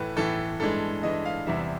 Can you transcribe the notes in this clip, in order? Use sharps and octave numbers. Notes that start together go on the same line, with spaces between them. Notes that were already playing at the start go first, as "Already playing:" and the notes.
Already playing: A2 E3 A3 B4
A2 E3 A3 A4
G2 E3 G#3 A4
G2 E3 G#3 D#5
F5
E2 C3 E3 G3 E5